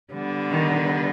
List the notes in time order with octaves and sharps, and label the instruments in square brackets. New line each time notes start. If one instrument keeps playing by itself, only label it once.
[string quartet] D3 G3 B3
[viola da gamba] D#3